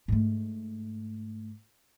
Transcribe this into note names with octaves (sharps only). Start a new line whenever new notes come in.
G#2 A3